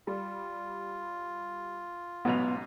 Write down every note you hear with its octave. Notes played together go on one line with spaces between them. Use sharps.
G3 F4
A1 G#2 B2 F#3 B3 F7